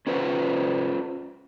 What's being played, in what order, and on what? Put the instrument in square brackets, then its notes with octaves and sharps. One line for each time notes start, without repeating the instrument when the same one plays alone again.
[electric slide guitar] C#4 F4 B4 C5